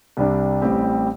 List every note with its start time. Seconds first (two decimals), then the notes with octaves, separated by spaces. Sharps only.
0.17 C2 C3 G3 D4
0.62 A1 A2 G3 C4 G4